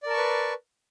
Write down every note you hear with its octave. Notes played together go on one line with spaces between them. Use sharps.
A#4 B4 D5 A5 C#6